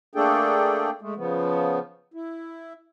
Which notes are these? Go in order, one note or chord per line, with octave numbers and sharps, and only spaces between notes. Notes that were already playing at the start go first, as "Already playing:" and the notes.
A3 A#3 D4 G#4 A4 G5
G#3 A3
C#3 F3 B3
E4